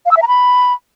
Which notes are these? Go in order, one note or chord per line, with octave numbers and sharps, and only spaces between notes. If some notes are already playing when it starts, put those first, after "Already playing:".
F5
E6
E5
A#5
B5